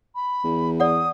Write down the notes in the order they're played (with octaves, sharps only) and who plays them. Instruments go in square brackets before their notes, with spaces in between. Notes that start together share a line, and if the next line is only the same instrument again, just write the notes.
[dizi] B5
[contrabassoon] E2
[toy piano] D5 F#5 [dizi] D#6